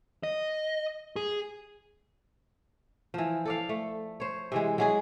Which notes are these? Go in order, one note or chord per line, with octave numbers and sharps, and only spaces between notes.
D#5
G#4
E3 F3
A4 D5 F5
A3
C5 C#5
C3 E3 G#3
F#3 G#3 G#4